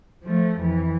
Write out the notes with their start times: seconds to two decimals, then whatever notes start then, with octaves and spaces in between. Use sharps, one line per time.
0.23 F3 A3
0.59 F2 E3